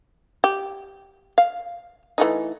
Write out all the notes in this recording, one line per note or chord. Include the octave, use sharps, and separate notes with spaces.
G4
F5
E3 A3 D#4